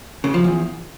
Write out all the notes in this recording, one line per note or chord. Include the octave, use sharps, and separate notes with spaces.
C#3
F3
E2